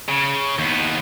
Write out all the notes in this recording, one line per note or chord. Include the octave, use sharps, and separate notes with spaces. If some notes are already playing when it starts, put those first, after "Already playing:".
C#3
D#2 B3